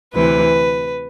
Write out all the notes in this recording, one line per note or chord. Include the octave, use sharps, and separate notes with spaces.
D2 C3 E3 B4